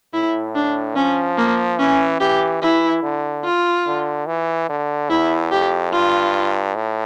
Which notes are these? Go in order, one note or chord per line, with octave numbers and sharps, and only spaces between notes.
A2 E4
D4
F3 C#4
A#3
E3 C#4
E3 G4
E3 E4
D3
F4
D3
E3
D3
E2 E4
F2 G4
G2 F4
A2